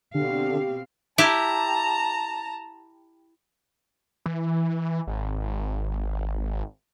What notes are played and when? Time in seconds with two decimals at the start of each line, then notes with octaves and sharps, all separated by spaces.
0.15 B2 D3 C4 G4 F5
1.18 E4 G4 A5 A#5
4.26 E3
5.07 G#1